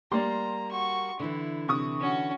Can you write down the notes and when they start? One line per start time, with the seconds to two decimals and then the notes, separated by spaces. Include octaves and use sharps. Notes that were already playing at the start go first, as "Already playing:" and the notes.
0.11 G3 A#3 G4 D5 A#5 C6
0.71 F#4 C#6
1.20 D3 E3 E4
1.68 C3 C#6 D#6
2.00 C#4 F#4